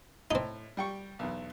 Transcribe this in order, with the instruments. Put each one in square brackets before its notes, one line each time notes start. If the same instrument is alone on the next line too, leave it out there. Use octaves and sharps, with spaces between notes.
[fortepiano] A2 [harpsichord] C4 D#4
[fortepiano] G3 G5 C#6
B1 E2